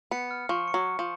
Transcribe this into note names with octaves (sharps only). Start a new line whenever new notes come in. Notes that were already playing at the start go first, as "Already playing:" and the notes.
B3 C#7
F6
F3 C#6
C#7
F#3
C#6
F3